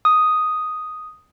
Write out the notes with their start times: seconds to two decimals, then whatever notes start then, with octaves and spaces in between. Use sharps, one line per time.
0.05 D#6